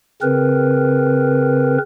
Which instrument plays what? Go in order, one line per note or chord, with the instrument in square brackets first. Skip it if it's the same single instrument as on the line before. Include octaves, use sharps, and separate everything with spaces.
[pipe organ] C#3 C4 A#4 B4